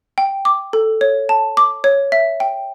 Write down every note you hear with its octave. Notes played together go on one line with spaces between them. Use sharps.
G5
D6
A4
C#5
A5
D6
C#5
E5
G5